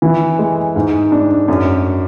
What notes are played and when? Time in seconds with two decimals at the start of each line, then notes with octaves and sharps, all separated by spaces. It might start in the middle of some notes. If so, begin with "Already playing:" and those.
0.02 E3
0.39 G#3
0.76 G#2
1.12 D4
1.48 F#2